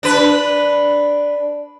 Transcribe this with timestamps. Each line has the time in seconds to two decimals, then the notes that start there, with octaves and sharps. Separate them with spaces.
0.03 D4 B4